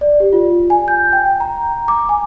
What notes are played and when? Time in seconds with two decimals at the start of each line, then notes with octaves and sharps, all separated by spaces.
0.01 D5
0.20 G4
0.33 F4
0.70 G#5
0.88 G6
1.13 G5
1.40 A#5
1.88 D6
2.09 G#5